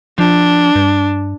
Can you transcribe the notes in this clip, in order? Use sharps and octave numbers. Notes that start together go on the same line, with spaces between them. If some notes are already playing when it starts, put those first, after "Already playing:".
F3 D4
G2